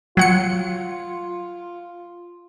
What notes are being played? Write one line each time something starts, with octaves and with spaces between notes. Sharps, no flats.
F#3 F4 F#5 C#7